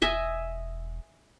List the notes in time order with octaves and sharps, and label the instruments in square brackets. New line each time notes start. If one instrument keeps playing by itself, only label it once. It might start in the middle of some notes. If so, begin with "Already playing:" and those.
[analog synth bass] E1 [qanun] D#5 E5 G#5